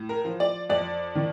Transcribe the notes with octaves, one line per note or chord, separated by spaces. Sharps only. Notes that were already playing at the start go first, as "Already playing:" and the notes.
Already playing: A2
A#4
F3
D5
F2 D5
D#3